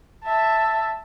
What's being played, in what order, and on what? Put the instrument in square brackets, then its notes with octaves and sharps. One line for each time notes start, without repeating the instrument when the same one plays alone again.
[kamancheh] E5 A5